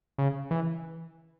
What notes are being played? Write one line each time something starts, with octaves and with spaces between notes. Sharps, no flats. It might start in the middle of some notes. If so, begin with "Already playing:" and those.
C#3
E3